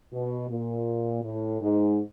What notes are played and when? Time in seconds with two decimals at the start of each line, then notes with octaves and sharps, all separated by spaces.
0.13 B2
0.49 A#2
1.23 A2
1.61 G#2